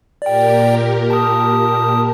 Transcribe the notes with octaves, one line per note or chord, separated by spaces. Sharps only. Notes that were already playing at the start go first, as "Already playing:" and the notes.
A#2 G4 A#4 D5 G5
A5 D#6